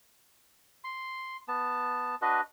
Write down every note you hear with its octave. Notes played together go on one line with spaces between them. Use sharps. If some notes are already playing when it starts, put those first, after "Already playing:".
C6
B3 A5
D4 F#4 B4 D#5